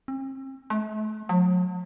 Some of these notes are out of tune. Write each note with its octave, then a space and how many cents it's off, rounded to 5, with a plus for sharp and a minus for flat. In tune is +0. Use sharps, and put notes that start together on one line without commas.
C4 +40
A3 -40
F#3 -45